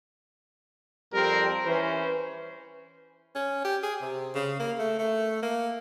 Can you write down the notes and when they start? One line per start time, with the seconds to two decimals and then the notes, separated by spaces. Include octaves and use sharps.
1.13 F2 G3 C4 G4 A#4
1.65 E3 C#4 B4 C5 B5
3.35 C#4
3.65 G4
3.83 G#4
4.01 C3
4.35 C#3
4.60 A#3
4.79 A3
4.99 A3
5.42 A#3